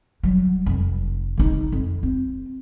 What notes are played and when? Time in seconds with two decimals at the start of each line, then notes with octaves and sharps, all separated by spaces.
0.23 F#3 G3
0.66 F1
1.37 C#3 D#4
1.72 F2
2.03 C4